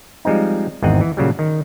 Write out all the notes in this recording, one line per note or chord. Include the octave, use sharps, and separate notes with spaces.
F3 G3 G#3 C4 D#4
G#1 E2 G#2 C4 D#5 F#5
E3
A#2 C#3 F#3 G3
D#3